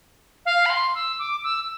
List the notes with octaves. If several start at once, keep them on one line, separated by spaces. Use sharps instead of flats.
F5
B5
C6
E6
D6
E6